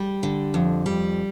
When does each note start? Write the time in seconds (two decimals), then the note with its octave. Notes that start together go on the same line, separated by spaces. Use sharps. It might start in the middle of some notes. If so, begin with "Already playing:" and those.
Already playing: G3
0.23 D3
0.54 F2
0.86 G3